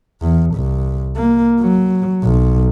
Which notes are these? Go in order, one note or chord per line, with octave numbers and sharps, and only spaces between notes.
E2
C2
A#3
F#3
B1